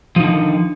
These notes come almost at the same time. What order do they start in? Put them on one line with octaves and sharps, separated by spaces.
F3 D#4 D3 D#3